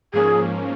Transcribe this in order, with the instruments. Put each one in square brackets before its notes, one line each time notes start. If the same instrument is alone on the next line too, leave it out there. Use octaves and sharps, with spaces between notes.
[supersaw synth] G#2 F3 A#3 C#4 [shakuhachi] G#4